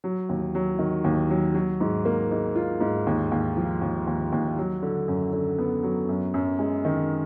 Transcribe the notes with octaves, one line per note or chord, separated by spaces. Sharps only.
F#3
D#2
F#3
D#3
D#2
F#3
F#3
G#2
A#3
G#2
F4
G#2
D#2
D#2
F3
D#2
D#2
D#2
F#3
D3
F#2
D3
B3
F#3
F#2
F#2
G#3
D#3